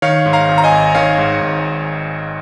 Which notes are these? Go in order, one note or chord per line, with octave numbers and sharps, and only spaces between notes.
D#3 C#5 F5
G#2
F5 A#5
G#1
A#5
D#5 G#5
G#1
D#3 C#5 F5
G#2
G#1